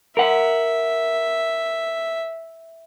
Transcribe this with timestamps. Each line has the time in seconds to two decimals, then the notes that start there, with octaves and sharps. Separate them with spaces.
0.17 A#4 E5 F#5